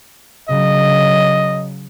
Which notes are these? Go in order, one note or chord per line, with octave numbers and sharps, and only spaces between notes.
C#3 F#3 D#5